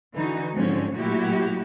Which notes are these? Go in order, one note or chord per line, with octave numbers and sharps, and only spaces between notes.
D3 E3 D#4 F#4
G#2 D3 F3 C4 C#4
A#2 F#3 A3 E4 F#4 G4